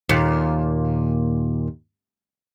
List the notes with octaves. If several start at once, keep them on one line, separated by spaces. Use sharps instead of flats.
D#2 A#2